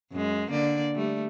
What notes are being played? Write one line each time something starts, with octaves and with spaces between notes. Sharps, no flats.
F#2 G#3
D3 A#3 D5
G3 A3